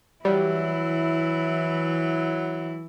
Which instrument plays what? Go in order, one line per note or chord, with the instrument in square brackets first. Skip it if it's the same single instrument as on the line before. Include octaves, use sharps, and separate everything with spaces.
[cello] E3 E4 [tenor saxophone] F#3 [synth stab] G3